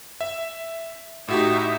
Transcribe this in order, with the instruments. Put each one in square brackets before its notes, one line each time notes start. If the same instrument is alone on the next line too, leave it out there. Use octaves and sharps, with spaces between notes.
[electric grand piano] E5
[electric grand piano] A2 F#4 G4 [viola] D#4 E5